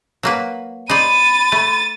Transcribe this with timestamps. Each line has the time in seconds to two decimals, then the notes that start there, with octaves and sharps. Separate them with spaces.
0.23 F#3 A#3 B4
0.89 D#4 C5 D5 B5 A6 D#7
1.52 A3